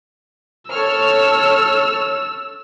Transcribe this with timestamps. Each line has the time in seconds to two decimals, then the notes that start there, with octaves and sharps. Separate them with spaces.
0.71 A4 C#5 E6 F6